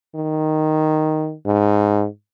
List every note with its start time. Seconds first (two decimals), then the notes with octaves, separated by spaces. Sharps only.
0.15 D#3
1.46 G#2